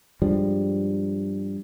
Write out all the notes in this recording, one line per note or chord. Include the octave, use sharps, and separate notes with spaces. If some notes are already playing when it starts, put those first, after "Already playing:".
G2 F3 G3 G#3